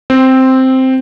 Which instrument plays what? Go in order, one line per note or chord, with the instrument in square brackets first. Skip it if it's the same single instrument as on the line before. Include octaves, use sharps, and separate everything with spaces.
[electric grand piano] C4